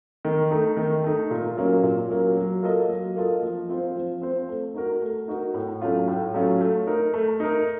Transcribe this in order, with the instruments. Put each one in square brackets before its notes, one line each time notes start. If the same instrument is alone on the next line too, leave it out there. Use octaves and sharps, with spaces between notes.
[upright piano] D#3
A3 D#4
D#3
A3 D#4
A#2
F#3 A#3 C#4 F4
A#2
F#3 A#3 C#4 F4
F#3
A#3 F4 A4 D#5
F#3
A#3 F4 A4 D#5
F3
C4 F4 C5
F3
C4 F4 C5
A3
D#4 F#4 A#4
A3
D#4 F#4 A#4
A2
F#3 A3 C#4 F4
A2
F#3 A3 C#4 F4
A3
D#4 A#4
A3
D#4 A#4